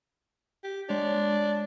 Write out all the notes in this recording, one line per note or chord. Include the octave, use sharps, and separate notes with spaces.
G4
G#3 D4 C#5